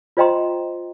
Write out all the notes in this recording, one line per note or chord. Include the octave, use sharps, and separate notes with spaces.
F4 C5 D#5 G5 A#5 C6